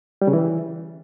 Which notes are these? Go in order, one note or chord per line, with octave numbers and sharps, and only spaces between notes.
G3
C#3
E3